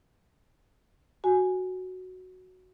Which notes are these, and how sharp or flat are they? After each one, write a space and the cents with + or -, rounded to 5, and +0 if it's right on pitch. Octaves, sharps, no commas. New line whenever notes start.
F#4 +0 G#5 +0